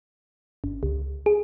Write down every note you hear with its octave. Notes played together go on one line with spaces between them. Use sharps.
G1
C#2
G#4